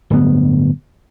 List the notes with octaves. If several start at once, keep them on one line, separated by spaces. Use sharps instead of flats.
D1 G1 B3